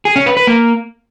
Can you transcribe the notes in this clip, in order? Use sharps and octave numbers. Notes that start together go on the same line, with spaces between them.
G#4
C#4
B4
B4
A#3